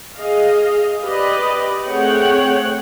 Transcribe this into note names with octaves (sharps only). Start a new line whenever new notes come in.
G#4 D#5 F5
G4 B4 D5 D#5
A3 C4 G#4 C#5 F#5 G5